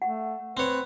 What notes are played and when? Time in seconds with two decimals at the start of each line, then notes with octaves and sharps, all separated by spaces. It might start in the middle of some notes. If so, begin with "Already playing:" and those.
0.02 A3 F#5
0.57 C4 B4 C#5